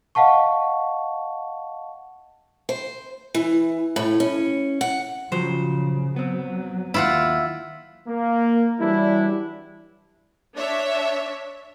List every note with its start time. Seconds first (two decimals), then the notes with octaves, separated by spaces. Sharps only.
0.15 D#5 F5 F#5 A5 C#6
2.69 C5
3.35 E3
3.96 A2
4.20 C#4
4.81 F#5
5.32 C#3 F3 F#3 C5
6.16 F#3 B3 C4
6.94 D#2 E4 F4 F#5
8.08 A#3
8.80 E3 F#3 G3 D4 E4
10.56 D4 C#5 E5